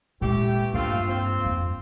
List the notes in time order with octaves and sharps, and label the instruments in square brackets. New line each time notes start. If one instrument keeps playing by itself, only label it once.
[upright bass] A#2 G#3 [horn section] E3 A3 G4
[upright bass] G2 A#3 [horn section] A3 C4 F4
[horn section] C4 F4
[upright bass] F2